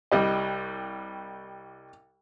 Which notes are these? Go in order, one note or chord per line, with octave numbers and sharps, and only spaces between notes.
C2 G3 D#5